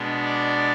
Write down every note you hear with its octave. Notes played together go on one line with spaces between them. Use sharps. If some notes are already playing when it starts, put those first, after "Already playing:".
Already playing: B2 G#3 B3 D4
D5